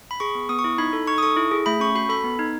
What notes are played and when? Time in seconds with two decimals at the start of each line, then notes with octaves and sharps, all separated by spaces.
0.11 B5
0.20 G#4 C#6
0.35 B3
0.49 B3 D#6
0.59 C#6
0.64 E4
0.78 D#4 B5
0.93 A4
1.07 D#4 C#6
1.18 D#6
1.23 A4 C#6
1.37 E4
1.51 G#4
1.66 A3 B5
1.80 C#4 C#6
1.95 F#4 B5
2.09 A4 B5
2.24 B3
2.39 D#4